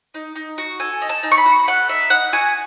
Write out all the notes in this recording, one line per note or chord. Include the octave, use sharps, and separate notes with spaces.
D#4
D#4
F#4
A4 G#5
D#4
A5
D#4
C#6
B5
F#4
A4 F#5
D#4 E5
D#4 F#5
F#4 G#5